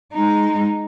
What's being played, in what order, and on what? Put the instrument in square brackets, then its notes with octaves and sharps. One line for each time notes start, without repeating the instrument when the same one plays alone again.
[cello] G#3 D#4